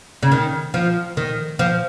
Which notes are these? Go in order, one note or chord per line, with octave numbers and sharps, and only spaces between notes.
C#3
D#3
F3
D#3
F3